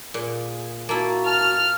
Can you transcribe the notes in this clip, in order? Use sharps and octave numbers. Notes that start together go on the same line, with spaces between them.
A#2 G#4
A#3 E4 F#4 A5
A5 F6